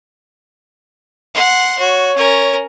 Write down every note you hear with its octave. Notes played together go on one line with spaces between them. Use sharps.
F#5 C6
F#4 C#5
C#4 A#4